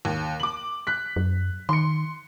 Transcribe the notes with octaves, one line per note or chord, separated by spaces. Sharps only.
D#2
D6 F#7
F#6 B6
F#2
D#3 C6 C#7